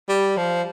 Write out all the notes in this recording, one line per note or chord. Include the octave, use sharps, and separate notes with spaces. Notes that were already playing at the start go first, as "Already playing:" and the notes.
G3
F3